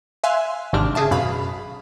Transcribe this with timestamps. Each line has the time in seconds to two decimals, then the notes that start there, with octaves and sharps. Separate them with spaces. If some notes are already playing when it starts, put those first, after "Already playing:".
0.24 E5 F5 G#5 C6 E6 F#6
0.73 G#1 G#2 C3 D4 F6
0.95 C#3 G#4 E5 A5
1.11 F#2 B2 F5 B5